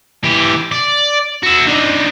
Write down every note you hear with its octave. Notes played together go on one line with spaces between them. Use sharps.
E3 G4
D5
F#4 E5
D4 D#4